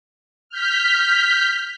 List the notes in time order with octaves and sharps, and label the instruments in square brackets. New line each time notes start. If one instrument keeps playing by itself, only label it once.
[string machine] F6 G6 B6